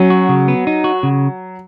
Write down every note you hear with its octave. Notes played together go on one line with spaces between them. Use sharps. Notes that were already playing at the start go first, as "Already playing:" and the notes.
Already playing: F#3 C#4
F#4
C#3
B3
D#4
F#4
C#3